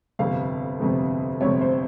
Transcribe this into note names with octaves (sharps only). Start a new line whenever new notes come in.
G1 F2 C3 F5
G1 F2 C3
G1 F2 C3 C#5
C5